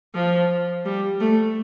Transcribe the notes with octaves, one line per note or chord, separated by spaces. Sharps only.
F3
G3
A3